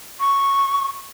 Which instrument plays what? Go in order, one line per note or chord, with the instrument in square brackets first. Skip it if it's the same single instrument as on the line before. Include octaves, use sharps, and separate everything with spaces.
[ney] C#6